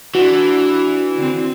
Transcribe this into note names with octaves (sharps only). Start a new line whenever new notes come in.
E3 D4 F#4
D3 C4